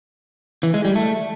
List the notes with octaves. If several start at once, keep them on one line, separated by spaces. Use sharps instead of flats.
E3
G#3
G3
A3